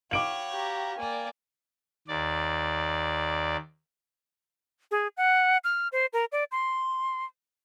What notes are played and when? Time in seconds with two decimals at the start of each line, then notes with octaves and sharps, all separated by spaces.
0.11 F#4 C#5 F5 G5 B5 D6 D7 F#7
0.52 G4 A#5
0.98 A#3 D5 G#5
2.08 D#2 D5
4.91 G#4
5.17 F#5
5.64 F6
5.92 C5
6.13 A#4
6.32 D5
6.52 C6